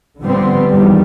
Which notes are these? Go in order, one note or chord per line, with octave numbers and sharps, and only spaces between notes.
D3 F3 G3 B3 C4
E2 D#3 F3 G3